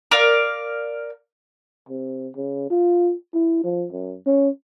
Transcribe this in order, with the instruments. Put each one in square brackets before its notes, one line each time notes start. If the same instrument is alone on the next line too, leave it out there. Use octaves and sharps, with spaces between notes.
[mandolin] A#4 D5 F5
[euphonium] C3
C#3
F4
E4
F3
F#2
C#4